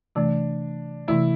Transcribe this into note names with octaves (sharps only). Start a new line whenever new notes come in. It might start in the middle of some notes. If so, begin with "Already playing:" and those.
C3 E3 A3 D4
C3 E3 A3 E4